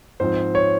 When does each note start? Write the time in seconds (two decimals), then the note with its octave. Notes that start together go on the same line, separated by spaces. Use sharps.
0.20 G#2 F3 C4 C5
0.55 C#5